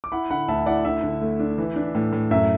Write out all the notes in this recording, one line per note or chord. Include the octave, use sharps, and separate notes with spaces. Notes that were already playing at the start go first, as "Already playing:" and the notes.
D6
E4 F#5 B5
D3 F#5 B5
D2 E5 A5
E4 D5 F#5
D3 E5
D3
A3
D4
E3
D4
A2
A2
F#2 E5